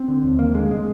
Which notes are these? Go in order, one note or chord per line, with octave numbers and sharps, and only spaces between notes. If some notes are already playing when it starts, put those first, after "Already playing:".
Already playing: C4
D3
D#2
D#2 A#3
D3 G#3
C3 G#3